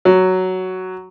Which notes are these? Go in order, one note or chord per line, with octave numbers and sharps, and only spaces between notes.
F#3